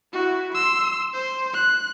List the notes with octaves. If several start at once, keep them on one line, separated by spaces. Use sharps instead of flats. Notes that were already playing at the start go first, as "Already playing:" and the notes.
E4 F#4
C6 E6
C5
F#6